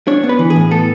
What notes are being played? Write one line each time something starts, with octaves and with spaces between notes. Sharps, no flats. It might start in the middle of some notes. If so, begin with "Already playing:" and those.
D4 C#5
B3
B4
E3
G#4
A2
B3 A4